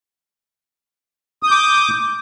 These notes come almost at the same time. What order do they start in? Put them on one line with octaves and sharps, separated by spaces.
D#6 G6 D6